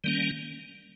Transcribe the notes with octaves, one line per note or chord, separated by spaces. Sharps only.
D#3 G3 A#3 C#4